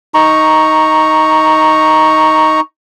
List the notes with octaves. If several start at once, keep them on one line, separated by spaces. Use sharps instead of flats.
D#4 A#5 C#6